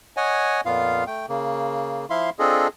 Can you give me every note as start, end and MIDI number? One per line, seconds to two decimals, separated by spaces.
0.17 0.61 73
0.17 0.61 75
0.17 0.61 78
0.17 0.61 80
0.66 1.04 41
0.66 1.04 46
0.66 1.04 59
0.66 1.04 65
0.66 1.04 77
1.07 1.26 57
1.07 1.26 79
1.29 2.06 49
1.29 2.06 58
2.10 2.30 53
2.10 2.30 64
2.10 2.30 76
2.10 2.30 77
2.10 2.30 84
2.39 2.68 60
2.39 2.68 62
2.39 2.68 65
2.39 2.68 68
2.39 2.68 69
2.39 2.68 75